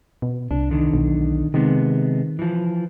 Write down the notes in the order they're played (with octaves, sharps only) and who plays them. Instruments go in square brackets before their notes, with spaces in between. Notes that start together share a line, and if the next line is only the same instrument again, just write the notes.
[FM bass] B2
[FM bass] C2 [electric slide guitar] D4
[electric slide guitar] E2 D3 D#3
[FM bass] B1
[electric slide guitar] C3 G#3 B3 [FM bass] D#3
[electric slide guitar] E3 F3